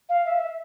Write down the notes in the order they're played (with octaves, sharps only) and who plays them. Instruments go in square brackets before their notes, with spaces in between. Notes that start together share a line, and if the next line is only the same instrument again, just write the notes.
[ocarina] F5
E5
E5